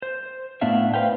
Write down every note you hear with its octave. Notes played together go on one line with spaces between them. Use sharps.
C5
A2 B3 D4 E5 F5
B4 C5 F5 G5